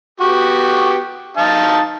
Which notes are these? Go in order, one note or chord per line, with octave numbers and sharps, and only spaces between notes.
B3 F#4 G4
D#4 F5 A5